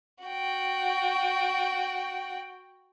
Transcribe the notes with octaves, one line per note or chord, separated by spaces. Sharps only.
F#4 G5